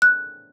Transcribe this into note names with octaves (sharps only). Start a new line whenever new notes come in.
F#6